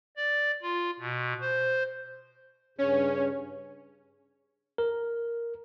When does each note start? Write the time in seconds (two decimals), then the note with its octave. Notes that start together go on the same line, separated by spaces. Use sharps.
0.17 D5
0.62 F4
0.99 B2
1.41 C5
2.78 G2 C#3 C#4 C#5
4.78 A#4